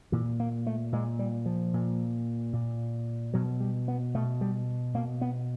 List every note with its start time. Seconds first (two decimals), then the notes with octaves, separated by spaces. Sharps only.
0.12 A#2 E3
0.40 A#3
0.67 A3
0.92 A#2 G#3
1.19 G3
1.46 F3
1.74 A#2
2.53 A#2
3.34 B2 F#3
3.61 G3
3.88 B3
4.14 B2 A3
4.41 G3
4.94 B2 A#3
5.21 B3